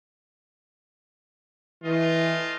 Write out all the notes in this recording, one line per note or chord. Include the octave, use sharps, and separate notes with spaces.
E3 A3 F4 D#5